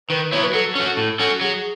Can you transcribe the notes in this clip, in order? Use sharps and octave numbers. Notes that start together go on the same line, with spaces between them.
D#3 B4
F#3 B3 E4 C#5
B4
F#3 A4
C#4 F#4
A2
F#3 C#4 F#4
F#3 G#4